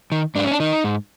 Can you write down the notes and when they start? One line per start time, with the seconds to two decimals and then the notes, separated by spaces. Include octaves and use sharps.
0.12 D#3
0.35 G#2 D4
0.44 C#4
0.51 D4
0.60 D#3 D#4
0.84 G#2